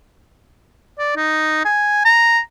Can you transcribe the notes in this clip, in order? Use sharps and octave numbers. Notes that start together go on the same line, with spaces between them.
D5
D#4
G#5
A#5